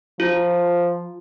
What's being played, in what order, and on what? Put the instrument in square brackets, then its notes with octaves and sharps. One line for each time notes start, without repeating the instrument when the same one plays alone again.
[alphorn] F3 [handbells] F4